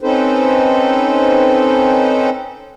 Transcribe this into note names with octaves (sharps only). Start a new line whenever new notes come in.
C4 C#4 D#4 A4 B4 C5